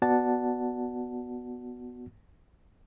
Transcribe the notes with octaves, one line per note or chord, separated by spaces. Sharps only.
B3 F#4 D5 F#5 A5